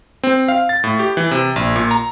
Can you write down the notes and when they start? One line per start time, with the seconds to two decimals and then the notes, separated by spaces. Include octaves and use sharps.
0.24 C4
0.48 F5
0.69 A6
0.84 A2
0.99 G4
1.17 E3
1.31 C3
1.56 A#1
1.76 A#2
1.91 A#5